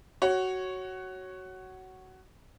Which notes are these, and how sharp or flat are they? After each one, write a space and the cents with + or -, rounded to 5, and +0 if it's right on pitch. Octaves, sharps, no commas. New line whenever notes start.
F#4 +15 C#5 -5